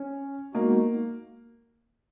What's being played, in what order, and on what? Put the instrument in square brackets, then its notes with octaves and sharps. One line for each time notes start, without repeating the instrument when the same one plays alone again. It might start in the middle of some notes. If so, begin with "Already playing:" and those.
Already playing: [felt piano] C#4
[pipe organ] G#3 B3 D#4 F#4 [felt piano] A#3